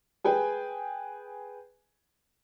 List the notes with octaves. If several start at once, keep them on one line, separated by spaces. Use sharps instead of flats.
G#4 B4 G5 G#5